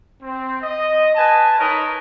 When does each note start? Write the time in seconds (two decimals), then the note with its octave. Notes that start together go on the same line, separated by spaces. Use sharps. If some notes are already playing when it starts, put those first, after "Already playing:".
0.22 C4
0.62 D#5
1.15 B4 G#5 A5
1.59 D#4 A#4 B4 C#5 D#5